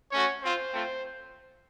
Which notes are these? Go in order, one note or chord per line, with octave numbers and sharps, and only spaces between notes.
A3 C#4 F#4 C#5
C4 F4 C5
A3 C4 F4